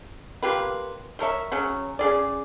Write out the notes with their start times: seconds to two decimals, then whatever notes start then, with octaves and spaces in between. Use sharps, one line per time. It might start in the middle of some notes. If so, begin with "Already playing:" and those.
0.43 A#3 F4 G4 B4
1.19 A3 A#4 C#5 E5
1.52 C#3 F#3 C#4
1.99 C#3 G#4 D5